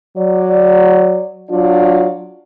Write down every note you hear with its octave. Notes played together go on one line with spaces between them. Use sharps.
F#3 D5
F#3 D4 F4 D5